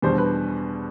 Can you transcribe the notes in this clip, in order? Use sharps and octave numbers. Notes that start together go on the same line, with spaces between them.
E2 B2 G3 D4 C5
B4